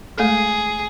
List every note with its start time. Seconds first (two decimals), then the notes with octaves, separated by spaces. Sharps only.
0.18 G#3 A3 G#4 A4